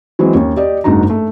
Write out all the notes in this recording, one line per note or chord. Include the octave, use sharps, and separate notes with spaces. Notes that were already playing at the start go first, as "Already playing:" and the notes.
E3 F#3 G#3 C4
D#2 C#4
G4 D5 D#5
F#1 G#2 D4 D#4 F#4 A#5
A3